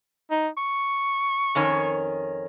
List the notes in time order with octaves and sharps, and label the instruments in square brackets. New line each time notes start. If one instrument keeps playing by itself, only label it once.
[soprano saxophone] D#4
C#6
[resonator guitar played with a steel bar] F2 D#3 C#4